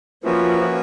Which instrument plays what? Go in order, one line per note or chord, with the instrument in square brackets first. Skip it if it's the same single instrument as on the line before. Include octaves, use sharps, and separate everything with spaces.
[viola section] F3 [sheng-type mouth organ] A#3 C#4 F#4 B4 E5